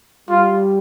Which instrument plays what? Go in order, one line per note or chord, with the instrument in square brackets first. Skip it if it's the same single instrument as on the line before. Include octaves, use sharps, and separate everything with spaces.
[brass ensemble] G3 [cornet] F4